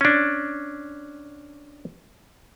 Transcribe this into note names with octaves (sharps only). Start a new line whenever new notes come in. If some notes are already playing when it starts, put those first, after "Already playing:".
C#4 D4